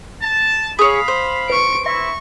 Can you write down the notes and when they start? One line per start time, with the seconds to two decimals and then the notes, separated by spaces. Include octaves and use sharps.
0.22 A5
0.79 G#4 C#5 F5 B5 D#6
1.08 C5
1.50 B4 C#6 D7
1.86 E4 E5 C#6